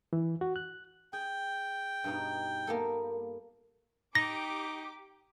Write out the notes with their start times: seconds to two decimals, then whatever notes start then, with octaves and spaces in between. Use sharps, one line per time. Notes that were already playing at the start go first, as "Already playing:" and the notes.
0.13 E3
0.41 F#4
0.56 F#6
1.13 G#4 G5
2.04 G2 B2 D#4
2.67 A#3 B3 A4
4.15 D#4 G4 D6 A#6